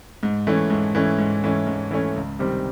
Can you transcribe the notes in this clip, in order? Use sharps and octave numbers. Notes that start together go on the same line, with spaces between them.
G#2
E3 A3 C#4
G#2
E3 A3 C#4
G#2
E3 A3 C#4
G#2
E3 A3 C#4
C#2
C3 D#3 G3 C4